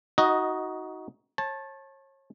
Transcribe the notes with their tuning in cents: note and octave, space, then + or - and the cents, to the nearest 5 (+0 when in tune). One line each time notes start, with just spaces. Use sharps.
D#4 +20 F#4 +5 D#5 +0
C#5 -35 A5 -5